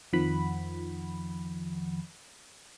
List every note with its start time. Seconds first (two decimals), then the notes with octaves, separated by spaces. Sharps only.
0.13 F2 D#3 F3 F#5 B5